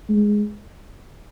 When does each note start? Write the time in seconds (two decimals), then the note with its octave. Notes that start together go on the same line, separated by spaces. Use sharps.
0.09 G#3